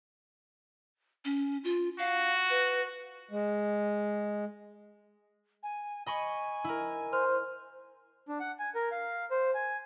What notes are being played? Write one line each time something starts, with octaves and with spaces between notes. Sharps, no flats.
C#4
F4
F#4 F5
B4
G#3
G#5
D#5 G#5 B5 C#6
E4 A#4
C5 F6
D4
F#5
G#5
A#4
F5
C5
G#5